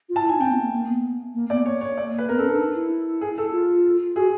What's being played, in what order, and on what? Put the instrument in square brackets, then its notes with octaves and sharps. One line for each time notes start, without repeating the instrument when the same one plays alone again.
[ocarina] F4
[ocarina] E4 [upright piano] A5
[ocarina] D#4 [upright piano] G#5
[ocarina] C4 [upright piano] G5
[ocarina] B3
A#3
A#3
B3
A#3
[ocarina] B3 [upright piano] D5
[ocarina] A#3 [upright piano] C#5
[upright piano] C#5
D5
B4
[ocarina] B3 [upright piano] A#4
[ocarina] C#4 [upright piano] A4
[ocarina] D4 [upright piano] A4
[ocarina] D#4
E4
[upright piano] G#4
A4
[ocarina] F4
[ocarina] F#4 [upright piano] G#4